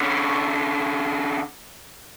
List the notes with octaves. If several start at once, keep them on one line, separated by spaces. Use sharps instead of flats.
D3 C#4